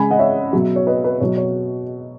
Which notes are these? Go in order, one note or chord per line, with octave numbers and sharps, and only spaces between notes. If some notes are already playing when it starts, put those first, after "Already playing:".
Already playing: C#3 G#3 G#5 B5
D#5 F#5
C#5 E5
B2 F#3
C#5
B4 D#5
B4
B2 F#3 C#5
C#5